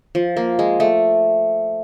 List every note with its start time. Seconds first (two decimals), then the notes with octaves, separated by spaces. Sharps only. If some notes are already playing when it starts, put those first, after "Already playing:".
0.15 F3
0.37 A#3
0.59 G#3
0.80 A3